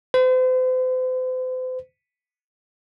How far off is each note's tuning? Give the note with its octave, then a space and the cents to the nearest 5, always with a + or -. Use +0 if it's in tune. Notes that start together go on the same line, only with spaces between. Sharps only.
C5 -40